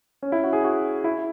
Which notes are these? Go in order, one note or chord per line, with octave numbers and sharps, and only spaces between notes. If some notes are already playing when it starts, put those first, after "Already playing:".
C#4
E4
F#4
G#4
F#4
E4